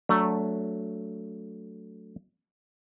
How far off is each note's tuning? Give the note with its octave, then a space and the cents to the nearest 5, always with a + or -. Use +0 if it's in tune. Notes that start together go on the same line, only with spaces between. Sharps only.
F#3 +0 A3 +5 D4 -20